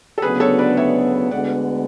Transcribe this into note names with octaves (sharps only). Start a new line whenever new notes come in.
A4
D2 C#3 F#3 B3 D4 G#4 B4
A4 C#5
B4 D5
C#5 E5
D2 D3 G#3 B3 D5 F#5